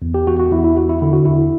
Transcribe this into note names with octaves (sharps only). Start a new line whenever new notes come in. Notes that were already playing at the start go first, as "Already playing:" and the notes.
E2
G4
E2 F#4
F#4
E2 E4
E4
E2 F#4
E4
D3 E4
F#4
E2 E4